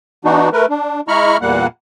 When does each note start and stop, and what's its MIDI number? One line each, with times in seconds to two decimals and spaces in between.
0.25 0.49 52
0.25 0.49 59
0.25 0.49 62
0.25 0.49 63
0.25 0.49 66
0.53 0.66 57
0.53 0.66 70
0.53 0.66 71
0.69 1.01 62
1.08 1.37 56
1.08 1.37 64
1.08 1.37 82
1.08 1.37 83
1.08 1.37 85
1.08 1.37 89
1.42 1.67 40
1.42 1.67 46
1.42 1.67 55
1.42 1.67 58
1.42 1.67 78